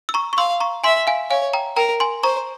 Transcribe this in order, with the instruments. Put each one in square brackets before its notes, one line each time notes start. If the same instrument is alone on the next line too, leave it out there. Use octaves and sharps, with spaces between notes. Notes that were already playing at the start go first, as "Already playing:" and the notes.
[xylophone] E6
A#5 C#6
C#6
[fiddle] F5 [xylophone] C6 E6
[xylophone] A#5 C#6
[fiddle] E5 [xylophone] G#5 C6
[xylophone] F5 G#5
[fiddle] C#5 [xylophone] F5 G#5
[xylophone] G5 A#5
[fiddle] A#4 [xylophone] G5 A#5
[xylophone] G#5 C6
[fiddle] C5 [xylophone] A#5 C#6